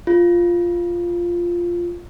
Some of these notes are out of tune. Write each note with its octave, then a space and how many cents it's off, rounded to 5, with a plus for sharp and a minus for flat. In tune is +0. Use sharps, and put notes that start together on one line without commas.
F4 -5